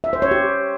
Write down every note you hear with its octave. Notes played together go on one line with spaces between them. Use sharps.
E5
C5
C#5
G4